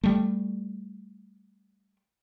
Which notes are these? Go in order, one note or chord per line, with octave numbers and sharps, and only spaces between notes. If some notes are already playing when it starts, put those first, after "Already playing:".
G3 A3